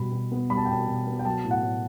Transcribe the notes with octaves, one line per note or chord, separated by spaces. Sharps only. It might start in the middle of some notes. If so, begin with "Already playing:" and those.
Already playing: B2 G3 B5
B2
B3
G3 B5
A5
G5
B2 A5
B2
B3
G5
F#3 A5
A2
F#5
A2